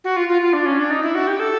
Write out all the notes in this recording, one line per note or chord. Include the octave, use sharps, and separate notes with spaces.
F#4
F4
F4
F4
D4
C#4
D4
D#4
E4
F#4
G4
A4